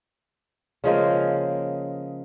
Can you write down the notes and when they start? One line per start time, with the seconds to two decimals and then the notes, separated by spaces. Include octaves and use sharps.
0.84 C#3 F3 G#3 A#3